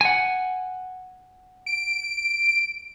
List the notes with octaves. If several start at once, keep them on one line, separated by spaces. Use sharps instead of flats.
F#5 G#5
D7